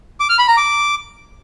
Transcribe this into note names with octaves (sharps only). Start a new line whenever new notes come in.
D6
F6
B5
A#5
D6